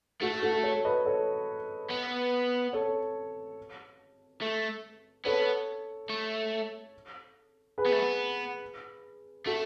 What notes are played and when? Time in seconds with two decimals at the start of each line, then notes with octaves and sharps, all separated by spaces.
0.22 A3 F#4 A4
0.42 F#4 A4
0.64 A4 C#5
0.85 B4 D#5
1.06 A4 C#5
1.90 B3
2.73 A4 C#5
4.41 A3
5.25 B3 A4 C#5
6.10 A3
7.78 G#4 B4
7.86 B3
7.92 A3
7.99 B3
9.46 A3 F#4 A4